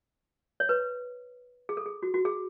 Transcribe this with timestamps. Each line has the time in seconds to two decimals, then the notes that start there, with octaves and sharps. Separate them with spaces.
0.60 C#5
0.69 B4
1.69 G#4
1.77 A4
1.86 G#4
2.03 F#4
2.14 F#4
2.25 G#4